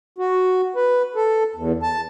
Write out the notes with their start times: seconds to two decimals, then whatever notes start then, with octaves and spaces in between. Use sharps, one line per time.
0.18 F#4
0.76 B4
1.15 A4
1.55 E2
1.83 A5